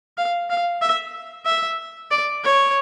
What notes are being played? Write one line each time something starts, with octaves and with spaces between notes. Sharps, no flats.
F5
F5
E5
E5
D5
C#5